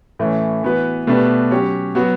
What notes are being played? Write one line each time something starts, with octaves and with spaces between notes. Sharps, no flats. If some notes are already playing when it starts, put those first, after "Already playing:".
A2 E3 A3 C#4
E3 B3 F#4 B4
B2 A3 D4 G4 B4
F#3 C#4 G4 C#5
F#3 B3 F#4